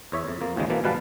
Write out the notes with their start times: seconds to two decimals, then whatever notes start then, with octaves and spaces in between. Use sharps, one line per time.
0.12 E2 C#5 E5
0.27 F2
0.41 F2 A#3
0.56 A1 D#2 C#3 F3 G#3
0.70 B2 E3 F3 A#3
0.83 G#1 B2 G3 B4 F5 A5